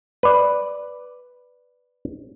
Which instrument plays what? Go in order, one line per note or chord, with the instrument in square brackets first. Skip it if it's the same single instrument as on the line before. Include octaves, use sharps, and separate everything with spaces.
[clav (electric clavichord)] B4 D5